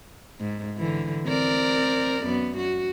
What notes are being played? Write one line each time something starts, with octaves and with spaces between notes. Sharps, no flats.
G#2
D3 E3
C4 A#4 D5
F#2 B3
F#4